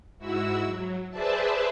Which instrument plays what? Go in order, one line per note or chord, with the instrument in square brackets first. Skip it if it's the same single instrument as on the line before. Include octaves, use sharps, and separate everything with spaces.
[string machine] G#2 E4 F#4 E6
F#3
G#4 B4 C5 D5 E5 A5